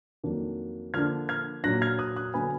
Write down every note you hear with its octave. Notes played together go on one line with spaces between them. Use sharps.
F2 D#3 F#3 A#3 D4
D3 F3 A#3 D4 F6 G#6
F6 G#6
A#2 F#3 D4 F#6 A#6
F6 G#6
D#6 F#6
D#6 F#6
D3 F#3 B3 G#5 B5